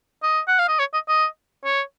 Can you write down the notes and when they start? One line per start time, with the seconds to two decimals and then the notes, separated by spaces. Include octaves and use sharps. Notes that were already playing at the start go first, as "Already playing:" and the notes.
0.23 D#5
0.48 F#5
0.59 F5
0.68 D#5
0.79 C#5
0.94 D#5
1.08 D#5
1.64 C#5